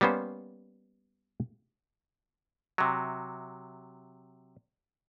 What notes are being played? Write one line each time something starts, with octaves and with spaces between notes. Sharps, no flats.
G3 A#3 B3 C#4 C5
C3 F#3